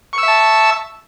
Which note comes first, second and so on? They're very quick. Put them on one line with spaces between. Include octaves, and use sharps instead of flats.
C#6 E6 E5 A5